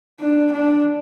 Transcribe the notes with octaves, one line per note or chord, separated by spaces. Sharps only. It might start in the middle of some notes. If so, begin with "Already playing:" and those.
D4
D4